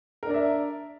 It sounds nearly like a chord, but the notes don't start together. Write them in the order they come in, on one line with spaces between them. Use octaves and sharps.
A#4 D4 D5 E5